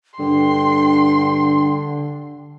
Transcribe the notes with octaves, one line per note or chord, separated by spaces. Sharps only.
G2 D3 G5 C6